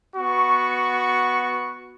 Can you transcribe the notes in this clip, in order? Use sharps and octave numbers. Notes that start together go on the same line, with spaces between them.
B3 F#4 C#6